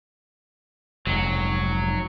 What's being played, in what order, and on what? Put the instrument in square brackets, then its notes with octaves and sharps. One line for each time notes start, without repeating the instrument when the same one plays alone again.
[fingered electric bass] F1 G#2 [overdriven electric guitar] F#3